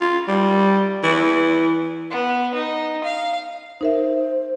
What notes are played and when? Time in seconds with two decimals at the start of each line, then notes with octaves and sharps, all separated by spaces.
0.01 F4
0.28 G3
1.03 E3
2.11 B3
2.54 D#4
3.04 F5
3.81 D#4 A#4 C5 E5